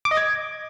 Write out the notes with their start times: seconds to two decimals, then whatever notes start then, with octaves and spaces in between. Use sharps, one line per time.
0.05 D6
0.11 D#5
0.17 G#6